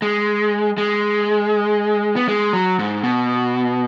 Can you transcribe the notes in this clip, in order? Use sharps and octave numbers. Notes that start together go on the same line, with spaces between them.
G#3
G#3
B3
G#3
F#3
G#2
B2